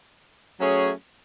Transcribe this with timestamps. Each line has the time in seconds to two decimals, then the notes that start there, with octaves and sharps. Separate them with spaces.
0.59 F#3 A3 C#4 G#4 C#5